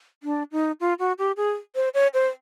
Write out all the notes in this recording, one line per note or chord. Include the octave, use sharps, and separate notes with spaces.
D4
D#4
F4
F#4
G4
G#4
C5
C#5
C5